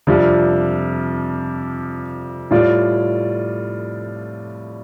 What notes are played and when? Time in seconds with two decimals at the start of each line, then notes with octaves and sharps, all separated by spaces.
0.07 F2 C3 G3 D4 F4
2.51 A2 G3 F4 D5